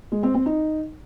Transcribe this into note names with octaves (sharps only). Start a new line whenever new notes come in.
G#3
C4
C4
D#4